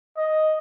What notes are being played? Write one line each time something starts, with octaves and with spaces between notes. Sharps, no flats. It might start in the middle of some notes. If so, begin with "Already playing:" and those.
D#5